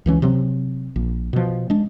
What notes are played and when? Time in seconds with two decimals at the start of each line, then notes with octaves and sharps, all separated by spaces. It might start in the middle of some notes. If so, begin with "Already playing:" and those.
0.06 C#2 E3 G3 C#4
0.22 C3 F#3 C4
0.96 A#1
1.33 B2 F3
1.70 G#3 D4